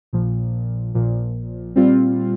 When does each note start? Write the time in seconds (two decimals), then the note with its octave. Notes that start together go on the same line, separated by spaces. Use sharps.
0.13 A#1 A#2 F3
0.95 A#1 A#2 F3
1.76 A#2 G3 C4 F4